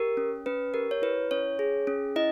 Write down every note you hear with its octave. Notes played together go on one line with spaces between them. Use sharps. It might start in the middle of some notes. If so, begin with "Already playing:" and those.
Already playing: G4 A#4
C#4
C#4 B4
G4 A#4
C#5
E4 B4
C#4 C#5
G#4
C#4
E4 D#5